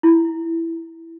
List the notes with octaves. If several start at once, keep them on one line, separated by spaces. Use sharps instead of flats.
E4